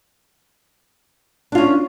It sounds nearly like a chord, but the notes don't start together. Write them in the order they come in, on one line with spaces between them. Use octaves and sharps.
D4 F4 C#4